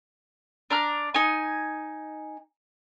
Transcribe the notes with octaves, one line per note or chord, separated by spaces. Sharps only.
D4 A#5 F6
D#4 G#5